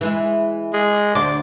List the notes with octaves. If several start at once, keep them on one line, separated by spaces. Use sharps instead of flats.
E3 G#3 E4
G#3
D2 C5 D5